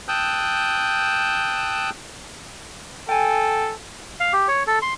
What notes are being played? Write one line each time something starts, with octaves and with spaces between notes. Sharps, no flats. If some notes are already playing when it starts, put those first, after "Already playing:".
G5 A5 D#6 E6 F#6 G6
A4 G5 G#5
F5
G4
C#5
A4
C6